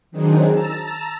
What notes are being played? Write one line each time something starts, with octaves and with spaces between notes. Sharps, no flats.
D#3 F#3 C4 D4 D#4 G#4
A5 A#5 E6